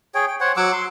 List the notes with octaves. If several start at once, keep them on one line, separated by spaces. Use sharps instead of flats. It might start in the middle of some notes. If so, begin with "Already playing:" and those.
G#4 C#5 G5
G5
C5 C#5 F#5
F#3 F#5 D6 E6
C6